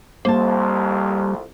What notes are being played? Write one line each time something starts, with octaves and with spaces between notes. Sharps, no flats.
C2 F2 G3 A#3 C5 A5